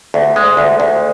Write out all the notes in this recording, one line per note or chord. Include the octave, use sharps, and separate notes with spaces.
D2
G#3
D2
D2